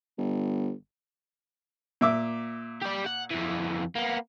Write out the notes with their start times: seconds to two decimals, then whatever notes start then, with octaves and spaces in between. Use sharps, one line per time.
0.18 G1
2.01 A#2 E5 D6
2.82 G4 D5
3.07 F#5
3.31 F2 E3
3.95 A#3 B3